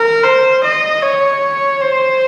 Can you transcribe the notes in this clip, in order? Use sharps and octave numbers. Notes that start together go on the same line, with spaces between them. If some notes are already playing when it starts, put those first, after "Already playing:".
Already playing: A#4
C5
D#5
C#5
C5